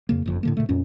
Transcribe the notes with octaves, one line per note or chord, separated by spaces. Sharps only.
F2 C#3 A#3
F#1 F2
A2 D3 A#3
A#2 C#3 A3
F2 A#2 C#4